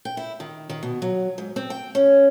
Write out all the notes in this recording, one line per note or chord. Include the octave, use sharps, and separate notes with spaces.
G5
E4
D#3
D#3
B2
F#3
G#2
C4
G5
C#4